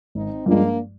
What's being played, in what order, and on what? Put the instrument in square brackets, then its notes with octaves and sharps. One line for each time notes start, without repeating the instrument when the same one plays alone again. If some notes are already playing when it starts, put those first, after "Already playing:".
[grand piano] G#1 [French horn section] C4 D#4
[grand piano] G2 F3 G#3 [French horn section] A#3 D4